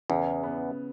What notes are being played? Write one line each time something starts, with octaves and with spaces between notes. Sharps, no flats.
E2 C#3
B3